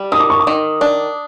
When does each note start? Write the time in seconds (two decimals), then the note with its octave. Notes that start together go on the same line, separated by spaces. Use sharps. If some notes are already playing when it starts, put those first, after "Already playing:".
Already playing: G3
0.12 D#3 D#6
0.20 D6
0.30 C#6
0.40 D6
0.47 D#3
0.81 D4